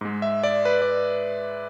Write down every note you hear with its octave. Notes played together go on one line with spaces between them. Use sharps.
G#2 G#3
E5
D5
B4
D5